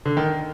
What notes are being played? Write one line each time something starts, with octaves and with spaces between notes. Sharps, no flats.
D3
D#3